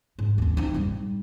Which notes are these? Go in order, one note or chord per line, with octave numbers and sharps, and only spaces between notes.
G#2 G#3
D#2 C4
C4 D#4
G#2 G3